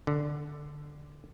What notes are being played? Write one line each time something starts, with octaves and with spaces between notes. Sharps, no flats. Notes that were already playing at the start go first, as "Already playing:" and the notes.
D3